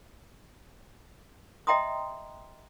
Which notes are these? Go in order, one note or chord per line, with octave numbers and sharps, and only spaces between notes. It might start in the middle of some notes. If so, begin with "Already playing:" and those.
D#5 E5 G5 A#5 C6 D#6